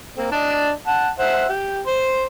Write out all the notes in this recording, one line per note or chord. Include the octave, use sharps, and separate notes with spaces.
A#3 C4
D4 D5 D#5
F#5 A5
C5 E5 F#5
G4
C5 C6